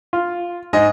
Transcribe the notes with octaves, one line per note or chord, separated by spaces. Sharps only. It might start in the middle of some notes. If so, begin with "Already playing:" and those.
F4
G#2 D#5